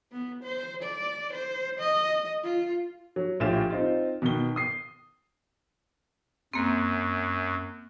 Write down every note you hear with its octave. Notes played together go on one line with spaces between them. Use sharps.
B3
C5
D5
C5
D#5
F4
F#3
A#1 A2 F4 G4 E7
C4 D#4 F4
B2 D#3 B3 G7
D#6 C7
F#2 A#3 C4